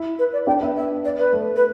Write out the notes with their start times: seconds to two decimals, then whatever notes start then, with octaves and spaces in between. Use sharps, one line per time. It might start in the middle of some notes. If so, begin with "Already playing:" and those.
Already playing: E4
0.18 B4
0.32 D5
0.46 D4 G5
0.61 B3 E5
0.76 E5
1.04 D5
1.18 B4
1.33 A3
1.55 B4